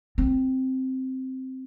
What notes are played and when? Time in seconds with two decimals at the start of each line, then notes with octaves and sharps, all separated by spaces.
0.18 C4